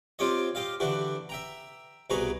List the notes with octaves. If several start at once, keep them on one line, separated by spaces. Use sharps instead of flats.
C4 F4 G4 C#5 D#5
G4 D#5 F5
D3 E3 F#4 G4
E5 G5 A#5
C2 B2 G#4 B4 A#5 C#6